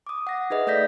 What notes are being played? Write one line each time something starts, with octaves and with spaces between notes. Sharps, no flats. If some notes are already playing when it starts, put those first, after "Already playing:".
D6 D#6
F#5 A#6
D#4 G#4 B4 D#5 E5
A3 A4 D5 G6 A#6 B6